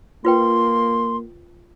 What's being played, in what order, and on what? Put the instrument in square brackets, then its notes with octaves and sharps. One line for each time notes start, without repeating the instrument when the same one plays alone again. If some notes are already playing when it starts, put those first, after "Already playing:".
[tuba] A#3 [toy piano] F4 B4 G5 [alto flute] C6